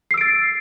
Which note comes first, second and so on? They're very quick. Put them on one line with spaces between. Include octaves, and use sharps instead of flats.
C7 E6 D7 A6